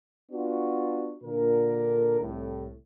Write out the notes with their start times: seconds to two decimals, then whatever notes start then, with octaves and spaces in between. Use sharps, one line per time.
0.32 B3 D4 F4 F#4
1.24 A#2 D3 A#4
2.21 C2 A2